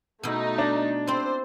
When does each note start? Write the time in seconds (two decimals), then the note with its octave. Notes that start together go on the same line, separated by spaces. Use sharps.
0.23 B2 A3 D#4 E4
0.58 D4
1.07 C4 E4 C5